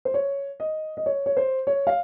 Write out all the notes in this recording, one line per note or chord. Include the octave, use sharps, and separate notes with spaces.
C5
C#5
D#5
D#5
C#5
C#5
C5
C#5
F5